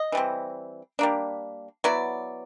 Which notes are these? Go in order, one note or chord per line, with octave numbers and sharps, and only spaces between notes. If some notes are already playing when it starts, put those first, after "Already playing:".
Already playing: D#5
E3 G3 C4
G3 A#3 D4
F#3 B3 E4 D5